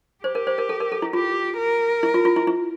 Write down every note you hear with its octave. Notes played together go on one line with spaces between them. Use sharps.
G4 C5
A#4
C5
A#4
A4
A#4
A4
E4
F4 G4
A#4
E4
F4
F4
E4
E4